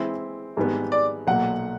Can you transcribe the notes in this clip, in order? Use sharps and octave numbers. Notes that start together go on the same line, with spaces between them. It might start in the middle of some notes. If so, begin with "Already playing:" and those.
Already playing: E3 G#3 C4 E4
G#1 G#2 D#3 G3 B3
D5
B1 A#2 F#3 A#3 F#5